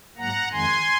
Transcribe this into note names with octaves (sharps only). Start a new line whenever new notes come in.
G#2 F#3 A#3 F#5 A#5
F2 D#3 G#3 G#5 C6